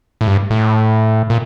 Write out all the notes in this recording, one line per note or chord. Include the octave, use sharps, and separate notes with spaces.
A2
G2
A2
A#2